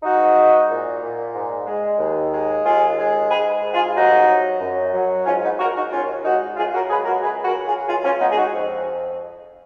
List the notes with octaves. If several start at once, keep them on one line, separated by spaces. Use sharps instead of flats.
G#2 D#4 F#4
G#2
A#2
A#2
G#2
G#3
D#2
G#3
D#2 F4 G#4
G#3
G#2 G#4 B4
G#2
F4 G#4
D#2 D#4 F#4
F#3
F#2
F#3
G#2 C#4 F4
B3 D#4
G#2 F#4 A#4
D#4 F#4
D#2 C#4 F4
G#3 D#4 F#4
F#2 F4 G#4
F#4 A#4
G#3 G#4 B4
F#4 A#4
C#2 G#4 B4
F#4 A#4
F#3
F4 G#4
C#2 F4 G#4
C#4 F4
G#3 B3 D#4
G#4
D#4 F#4
F2